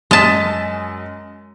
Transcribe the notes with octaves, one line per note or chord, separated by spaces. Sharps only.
F#2 G#3 D#5 A5 B6